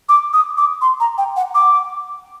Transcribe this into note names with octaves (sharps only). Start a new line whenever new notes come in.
D6
D#6
D6
C6
A#5
G5
F#5
D6